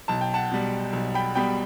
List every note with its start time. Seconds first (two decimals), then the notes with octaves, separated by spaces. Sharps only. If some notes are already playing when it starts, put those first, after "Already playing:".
0.08 B1 A5
0.21 G5
0.34 F#5 A5
0.51 B2 G3
0.93 B1
1.14 G5 B5
1.35 B2 G3 G5 B5